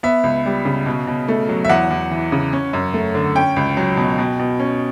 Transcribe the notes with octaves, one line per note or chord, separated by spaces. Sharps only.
B3 E5
C#2
G3
C#3
B2
B2
A3
F#3
E5
E2 F#5
E2
E3
C#3
C#4
F#2
A3
D3
C#4 G5
C#2
F#3
B2
B2
B2
C#4